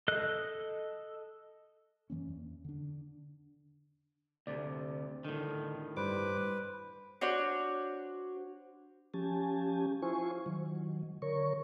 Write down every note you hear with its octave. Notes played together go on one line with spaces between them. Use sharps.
A4 D#5 F#6
F#2 E3 A#3 C#4
E2
D3 D4
D2 C3 D5
A2 D3 D#3
G2 G3 B4 C5 D6
D4 F#4 C5 C#5
F3 C#4 G4 G#5 A5
E4 F4 C5 G#5 C#6
D#3 F#3
D3 A#4 C#5 C#6